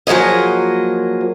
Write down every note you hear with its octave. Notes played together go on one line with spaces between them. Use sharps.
F3 F#3 A#3 G#4 D#5